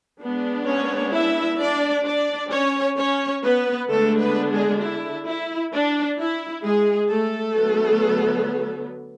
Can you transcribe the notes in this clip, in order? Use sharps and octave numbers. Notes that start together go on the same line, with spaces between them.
G#3 B3 D4
C#4 C#5
E4 E5
D4 D5
D4 D5
C#4 C#5
C#4 C#5
B3 B4
D3 G#3 A3 B3 D4 A4
B3 B4
G#3 G#4
E4
E4
D4
E4
G#3 G#4
A3 A4
D3 F#3 B3